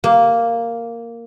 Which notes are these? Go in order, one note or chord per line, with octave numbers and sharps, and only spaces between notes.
A#3